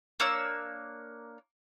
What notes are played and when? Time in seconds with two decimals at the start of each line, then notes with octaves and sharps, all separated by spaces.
0.20 A#3 D4 C#5 E6